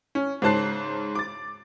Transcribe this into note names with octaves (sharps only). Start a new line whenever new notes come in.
C#4
G#2 C#3 C5 A5 F#6 C7
D6 A6